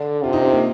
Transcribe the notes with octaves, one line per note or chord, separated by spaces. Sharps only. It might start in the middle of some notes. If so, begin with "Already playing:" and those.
Already playing: D3 D4
C3 F4
D#4
C4
A#3